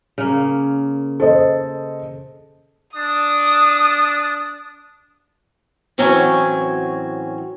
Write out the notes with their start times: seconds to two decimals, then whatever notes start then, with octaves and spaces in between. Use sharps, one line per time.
0.18 C#3 A#3
1.20 A4 C5 D#5
2.96 D4 D#6
5.98 A2 E3 F#3 C4 C#4 G#5